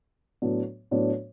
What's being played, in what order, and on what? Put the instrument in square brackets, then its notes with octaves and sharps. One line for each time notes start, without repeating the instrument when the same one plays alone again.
[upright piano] A2 F#3 B3 D4
A2 F#3 B3 D4